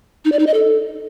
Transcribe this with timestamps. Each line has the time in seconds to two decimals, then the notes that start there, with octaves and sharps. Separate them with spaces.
0.25 D#4
0.32 D5
0.39 D#4
0.47 D#5
0.54 A4